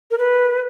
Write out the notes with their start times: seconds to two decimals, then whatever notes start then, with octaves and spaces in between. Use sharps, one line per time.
0.11 A#4
0.18 B4